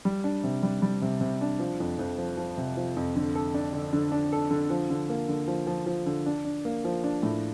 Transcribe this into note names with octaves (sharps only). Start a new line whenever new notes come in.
G3
D4
C3
G3
G3
C3
C3
D4
F3
F2
F2
F3
F3
C3
F3
F2
D3
A4
D4
D3
D3
D4
A4
D3
F3
D3
A#3
D3
F3
F3
F3
D3
D4
D4
A#3
F3
D4
A2